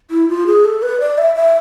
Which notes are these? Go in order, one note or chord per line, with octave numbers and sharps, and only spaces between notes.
E4
F4
G#4
A4
B4
D5
E5
E5